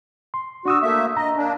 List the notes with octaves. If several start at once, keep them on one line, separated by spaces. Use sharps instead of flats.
C6
D4 F#4 D#6 E6
A3 A#3 E5
D#5 A#5
A#3 D4